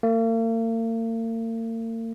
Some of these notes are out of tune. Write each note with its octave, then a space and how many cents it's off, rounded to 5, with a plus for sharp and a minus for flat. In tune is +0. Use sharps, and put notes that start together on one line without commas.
A#3 -45